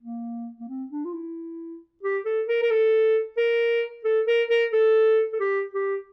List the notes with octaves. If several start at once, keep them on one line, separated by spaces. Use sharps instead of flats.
A#3
A#3
C4
D4
F4
E4
G4
A4
A#4
A#4
A4
A#4
A4
A#4
A#4
A4
A4
G4
G4